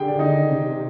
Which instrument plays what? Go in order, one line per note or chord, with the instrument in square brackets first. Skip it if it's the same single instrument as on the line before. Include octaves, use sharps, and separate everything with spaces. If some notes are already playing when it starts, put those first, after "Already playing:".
Already playing: [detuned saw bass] D3 [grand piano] G4 G#4 G5
[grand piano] D5
D#4 D#5
[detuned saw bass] C3